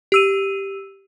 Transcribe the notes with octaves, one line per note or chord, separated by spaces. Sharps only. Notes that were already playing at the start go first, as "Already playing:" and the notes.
G4 E6 D#7